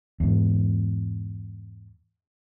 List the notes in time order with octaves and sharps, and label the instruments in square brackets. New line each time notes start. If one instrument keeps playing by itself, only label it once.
[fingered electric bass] E2 G#2